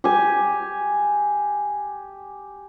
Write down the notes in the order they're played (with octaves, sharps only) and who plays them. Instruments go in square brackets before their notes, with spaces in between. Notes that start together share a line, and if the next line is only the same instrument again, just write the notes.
[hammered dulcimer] G4 G#5